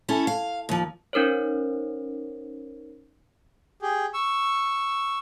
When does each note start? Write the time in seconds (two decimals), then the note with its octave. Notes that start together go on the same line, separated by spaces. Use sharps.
0.08 C#4 E4 A4
0.27 F5
0.69 D#2 F3
1.13 C#4 D#4 A#4 C5 C#5
3.82 G4 G#4
4.14 C#6 E6